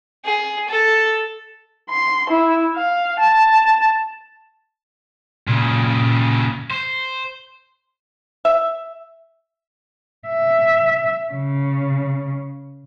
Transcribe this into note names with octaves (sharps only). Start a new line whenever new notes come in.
G#4
A4
C6
E4
F5
A5
A#2 C#3
C5
E5
E5
C#3